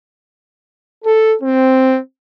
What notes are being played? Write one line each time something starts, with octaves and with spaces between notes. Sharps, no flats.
A4
C4